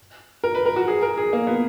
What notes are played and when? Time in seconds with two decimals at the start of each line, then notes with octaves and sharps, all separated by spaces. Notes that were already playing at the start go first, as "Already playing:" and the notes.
0.44 A#4
0.55 B4
0.65 A#4
0.76 F#4
0.88 G#4
1.03 A#4
1.18 G#4
1.33 A#3
1.47 B3